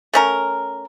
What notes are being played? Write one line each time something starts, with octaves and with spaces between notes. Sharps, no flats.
A3 C#4 A#4